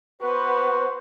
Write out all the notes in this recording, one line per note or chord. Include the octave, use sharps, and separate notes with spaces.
B3 F#4 B4 C5